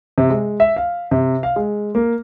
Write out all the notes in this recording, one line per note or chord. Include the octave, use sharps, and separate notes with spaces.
C3
G#3
E5
F5
C3
F5
G#3
A#3